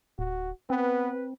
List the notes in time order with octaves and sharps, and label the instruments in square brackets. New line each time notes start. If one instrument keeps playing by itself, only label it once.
[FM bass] D1 [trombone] F#4
[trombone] B3 [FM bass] C4 [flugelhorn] B4